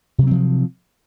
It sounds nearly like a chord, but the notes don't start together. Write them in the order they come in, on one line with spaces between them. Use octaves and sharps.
C3 F#3 C4 F3